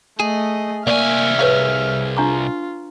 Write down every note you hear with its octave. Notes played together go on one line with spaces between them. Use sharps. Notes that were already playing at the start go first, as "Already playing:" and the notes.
A3 G#4 D#5
C2 A#3 D5 E5 G#5 C#6 F6
G#4 A#4 B4 C#5 F5 C#6
D4 F4 A#5 C#6